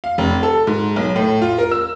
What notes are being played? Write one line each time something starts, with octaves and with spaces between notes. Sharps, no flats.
F5
F1
A4
G#2
B1
A2
F4
A#4
E6